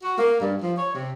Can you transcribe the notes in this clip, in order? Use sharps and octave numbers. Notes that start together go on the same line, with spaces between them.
F#4
A#3
G2
F3
C#5
C3